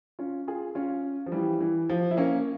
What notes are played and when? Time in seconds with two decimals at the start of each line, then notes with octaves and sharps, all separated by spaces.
0.19 C#4 F4
0.48 F4 G#4
0.75 C#4 F4
1.26 F3
1.32 E3 G3
1.61 E3
1.89 F3
2.11 E4
2.17 A#3 C#4